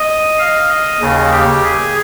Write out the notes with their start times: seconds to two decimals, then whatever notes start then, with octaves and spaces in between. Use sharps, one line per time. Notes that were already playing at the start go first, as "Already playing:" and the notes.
Already playing: D#5
0.39 F5
0.69 D#5
1.00 D#2 C#3
1.31 G4
1.63 G#4